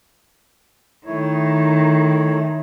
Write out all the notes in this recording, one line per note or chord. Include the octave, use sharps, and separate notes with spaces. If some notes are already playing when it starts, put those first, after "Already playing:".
D#3 A3 E4 C#5